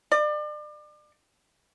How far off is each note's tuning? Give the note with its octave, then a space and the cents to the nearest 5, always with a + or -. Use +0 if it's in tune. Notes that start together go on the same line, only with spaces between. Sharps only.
D5 +35